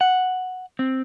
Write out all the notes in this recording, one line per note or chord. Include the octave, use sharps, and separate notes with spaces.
F#5
C4